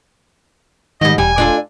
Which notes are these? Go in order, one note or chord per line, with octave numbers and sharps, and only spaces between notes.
G#2 D#3 G3 D#5
E1 G3 G#5
D4 F4 A4